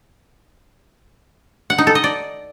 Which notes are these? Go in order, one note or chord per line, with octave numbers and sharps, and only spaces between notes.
F#5
D#4
A4
D#5
D5